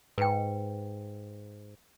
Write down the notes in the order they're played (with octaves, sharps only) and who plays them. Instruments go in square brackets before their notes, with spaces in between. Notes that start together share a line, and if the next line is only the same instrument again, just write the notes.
[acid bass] G#2 [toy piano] B4 G5